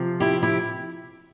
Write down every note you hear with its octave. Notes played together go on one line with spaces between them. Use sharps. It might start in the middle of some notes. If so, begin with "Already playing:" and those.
Already playing: C3 F3 C4
E4 G4
E4 G4